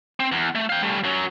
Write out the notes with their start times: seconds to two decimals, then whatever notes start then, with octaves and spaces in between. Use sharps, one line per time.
0.20 C4
0.32 E2
0.55 A3
0.70 F5 G5
0.83 G3 A3
1.04 F#2 F#3